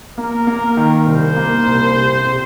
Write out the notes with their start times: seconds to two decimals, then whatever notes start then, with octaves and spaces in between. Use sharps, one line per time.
0.18 A#3 A#4
0.47 A#3
0.77 D#3
1.07 C2 C5
1.36 A#3
1.67 C2
1.96 C3
2.26 C3